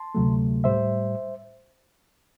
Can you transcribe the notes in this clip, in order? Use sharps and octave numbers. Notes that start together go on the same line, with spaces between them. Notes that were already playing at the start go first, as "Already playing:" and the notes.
Already playing: A5 C6
D2 C3 F#3 A3
A2 G3 C5 E5